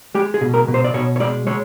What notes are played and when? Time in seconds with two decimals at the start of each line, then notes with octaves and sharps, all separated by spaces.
0.14 G#3 G4
0.34 G#4
0.41 B2
0.54 A#4
0.68 B2
0.74 C5
0.84 D5
0.94 B2 C#5
1.16 C#5
1.20 G#3 D5
1.47 G#3 C#5